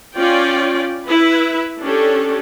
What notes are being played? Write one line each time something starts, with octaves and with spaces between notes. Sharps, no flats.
C#4 F4 D5 G5
E4 B4 E5
C#4 D4 G4 A4